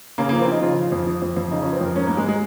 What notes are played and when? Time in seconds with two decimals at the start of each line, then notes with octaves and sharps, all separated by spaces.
0.18 C#3 A#3
0.29 A#3
0.33 F3
0.41 C4
0.48 F3 D#4
0.62 C#3 F4
0.78 F3
0.92 F2
1.07 F3
1.22 F2
1.37 F2
1.51 C#3 D#4
1.62 C#4
1.66 F3
1.73 C4
1.81 F2 A#4
1.96 G#2 C#4
2.07 G#2 A#3
2.17 G#3
2.28 G#3